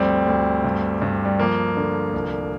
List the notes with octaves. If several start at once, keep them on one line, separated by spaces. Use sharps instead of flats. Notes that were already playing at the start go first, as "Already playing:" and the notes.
Already playing: D2 G2 F3 G3 C4
D2
G2
G2
G3
F3 A#3
D3
C2